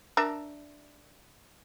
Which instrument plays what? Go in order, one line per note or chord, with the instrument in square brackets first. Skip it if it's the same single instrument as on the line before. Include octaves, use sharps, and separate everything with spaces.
[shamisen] D4 A#4 E5